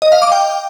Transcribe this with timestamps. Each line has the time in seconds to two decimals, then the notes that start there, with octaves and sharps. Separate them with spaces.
0.02 D#5
0.12 F5
0.22 D6
0.32 G5